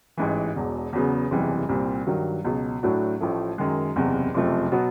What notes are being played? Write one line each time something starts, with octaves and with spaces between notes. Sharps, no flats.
A1 G#2 E3
E1 E2 B2
E2 C#3 F#3 B3
F#1 E2 C3 E3 G3
C2 A#2 G3 C4
G2 D#3 F#3
C#2 B2 F#3
A2 F#3 A3 D4 F#4
A1 A2 F3 A3
F#2 D#3 G#3
F#1 E2 C3
F#1 F2 C3 F3 A3
B2 F#3 B3